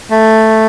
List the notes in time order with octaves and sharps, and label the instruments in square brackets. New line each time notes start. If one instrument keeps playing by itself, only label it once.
[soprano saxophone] A3